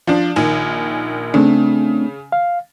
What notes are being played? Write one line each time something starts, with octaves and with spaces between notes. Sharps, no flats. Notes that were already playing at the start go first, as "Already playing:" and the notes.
F3 D4
A#1 D#3 G#5
C#3 A3 C4 D4
F5